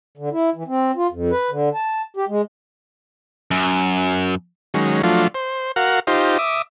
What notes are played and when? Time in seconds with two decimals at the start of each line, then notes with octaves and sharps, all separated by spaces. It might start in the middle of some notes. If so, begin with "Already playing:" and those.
0.18 D3
0.32 E4
0.55 E3
0.68 C4
0.96 F4
1.12 F2
1.31 B4
1.51 D3
1.74 A5
2.17 G4
2.29 G#3
3.51 F#2
4.74 D#3 F#3 G#3 C#4
5.03 F3 F#3 A3 D4 F4
5.35 C5
5.76 F#4 A#4 F5 F#5
6.07 D#4 F4 G4 C5
6.39 E5 D6 D#6